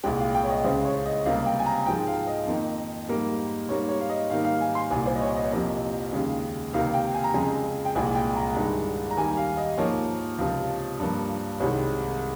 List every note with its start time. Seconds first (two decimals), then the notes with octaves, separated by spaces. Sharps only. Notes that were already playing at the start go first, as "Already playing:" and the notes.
0.04 C2 A#2 G#3 G5
0.19 F5
0.35 G5
0.44 C#5
0.50 D#5
0.64 C#2 C#3 G#3 C5
0.85 C#5
1.06 D#5
1.25 C#2 C3 G3 A#3 F5
1.46 G5
1.59 G#5
1.66 A#5
1.86 G#2 F3 G#3 G5
2.07 F5
2.27 D#5
2.47 F2 D#3 A#3
3.08 G#2 G3 A#3
3.69 G#2 G3 A#3 C#5
3.89 C#5
4.00 F5
4.09 D#5
4.30 G#2 D#3 G3 A#3 F5
4.45 F5
4.60 G#5
4.75 C6
4.90 C2 A#2 G3 G#5
5.06 C5
5.15 D#5
5.21 C#5
5.36 D#5
5.44 C#5
5.52 F2 C3 F3 A#3 D#5
6.13 D#2 C#3 G#3
6.73 C#2 C3 D#3 A#3 F5
6.94 G5
7.14 G#5
7.24 A#5
7.34 F2 C#3 G#3 G#5
7.85 G5
7.95 C2 A#2 G#3 G#5
8.15 G5
8.36 A#5
8.56 G2 D#3 G#3
9.11 A#5
9.17 D#2 D#3 G3 A#3 G#5
9.37 F5
9.57 D#5
9.78 G#2 F3 A#3 C#5
10.38 C#2 C3 F3
10.99 G2 F3 A#3
11.60 C2 C3 D#3 G#3 C#5